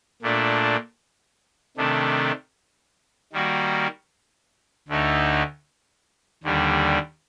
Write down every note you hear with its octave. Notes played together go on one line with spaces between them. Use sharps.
A#2 A3 D4
C3 D#3 A3 D4
D#3 G3 A#3 F#4
D2 D3 A3 D#4
D#2 D3 G3